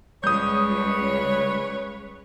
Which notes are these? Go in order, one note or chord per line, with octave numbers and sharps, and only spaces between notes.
C#2 C#3 G3 B4 C#5 D#6 G6